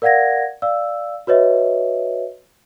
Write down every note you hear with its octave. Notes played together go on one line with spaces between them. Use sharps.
A#4 D5 F5 F#5 G#6 A#6
D5 F5 E6
F#4 B4 C#5 D#5 E5